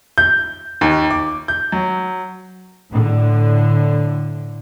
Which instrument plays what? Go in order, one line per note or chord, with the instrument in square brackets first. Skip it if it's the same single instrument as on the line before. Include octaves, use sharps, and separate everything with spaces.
[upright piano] G6
D#2
D6
G6
F#3
[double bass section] A2 D3